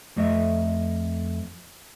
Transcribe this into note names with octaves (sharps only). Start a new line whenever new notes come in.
F2 A3 D#5 E5